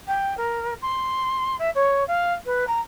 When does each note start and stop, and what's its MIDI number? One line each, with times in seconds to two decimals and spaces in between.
0.08 0.37 79
0.37 0.74 70
0.82 1.56 84
1.59 1.70 76
1.75 2.04 73
2.08 2.34 77
2.46 2.65 71
2.67 2.80 82